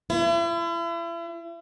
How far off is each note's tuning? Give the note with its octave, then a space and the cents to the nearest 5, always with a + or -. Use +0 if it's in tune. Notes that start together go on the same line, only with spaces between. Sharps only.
E4 +40